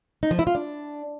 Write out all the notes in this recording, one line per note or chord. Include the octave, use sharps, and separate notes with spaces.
D#4
F3
E4
F4
D4